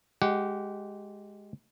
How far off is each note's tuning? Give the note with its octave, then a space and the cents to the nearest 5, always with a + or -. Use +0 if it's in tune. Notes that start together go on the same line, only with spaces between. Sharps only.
G#3 +0 G4 -20 F#5 +0